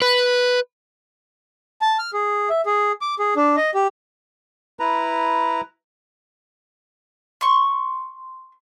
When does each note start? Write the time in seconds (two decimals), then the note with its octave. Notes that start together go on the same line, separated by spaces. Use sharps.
0.02 B4
1.81 A5
1.99 F6
2.13 G#4
2.49 E5
2.66 G#4
3.01 D6
3.19 G#4
3.36 D4
3.57 D#5
3.74 G4
4.80 E4 B4 A#5
7.41 C6 C#6